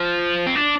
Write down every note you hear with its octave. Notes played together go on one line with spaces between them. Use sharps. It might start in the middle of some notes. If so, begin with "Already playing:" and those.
Already playing: F3
C4
D4